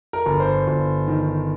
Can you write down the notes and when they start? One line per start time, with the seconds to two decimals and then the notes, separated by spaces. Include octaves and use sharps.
0.13 A#4
0.26 G1
0.40 C5
0.68 G1
1.08 D#3